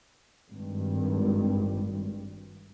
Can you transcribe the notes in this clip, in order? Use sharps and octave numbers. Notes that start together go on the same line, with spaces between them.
G#1 G2